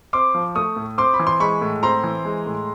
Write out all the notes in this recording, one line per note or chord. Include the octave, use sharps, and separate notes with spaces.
C4 C6 D6
F3
A3 C#6 D#6
A2
C4 C6 D6
B5
E3
C6
G#3 B5 C#6
A2
C4 A#5 C6
E3
G#3
A2